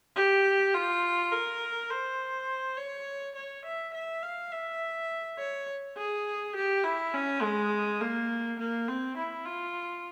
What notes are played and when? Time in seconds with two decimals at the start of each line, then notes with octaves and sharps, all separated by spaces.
0.16 G4
0.74 F4
1.32 A#4
1.90 C5
2.77 C#5
3.35 C#5
3.65 E5
3.94 E5
4.23 F5
4.52 E5
5.38 C#5
5.97 G#4
6.56 G4
6.84 E4
7.14 C#4
7.42 G#3
8.01 A#3
8.59 A#3
8.88 C4
9.17 E4
9.45 F4